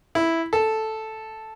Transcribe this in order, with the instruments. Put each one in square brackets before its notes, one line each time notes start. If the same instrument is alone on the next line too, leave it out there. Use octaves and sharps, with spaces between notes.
[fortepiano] E4
A4